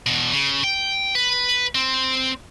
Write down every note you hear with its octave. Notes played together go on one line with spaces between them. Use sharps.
E2 B2
C#3
G5
B4
C4